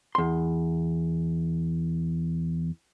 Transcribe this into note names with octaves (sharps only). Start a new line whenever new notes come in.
E2 C6